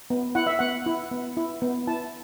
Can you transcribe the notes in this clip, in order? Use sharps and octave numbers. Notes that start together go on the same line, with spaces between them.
B3
E4 F#5
E5
B3 F#5
E4
B3
E4
B3
E4 A5